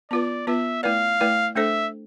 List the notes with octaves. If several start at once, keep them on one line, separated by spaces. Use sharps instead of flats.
B3 F4 B4 D5
B3 F4 B4 E5
A3 E4 B4 D5 F5
A3 E4 B4 D5
A3 D4 A4 C5 E5